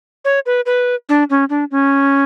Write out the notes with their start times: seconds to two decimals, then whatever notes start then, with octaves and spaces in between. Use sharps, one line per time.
0.25 C#5
0.46 B4
0.66 B4
1.09 D4
1.30 C#4
1.50 D4
1.71 C#4